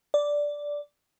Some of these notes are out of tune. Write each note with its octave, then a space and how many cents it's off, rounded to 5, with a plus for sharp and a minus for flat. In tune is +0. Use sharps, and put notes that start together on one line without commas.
D5 -5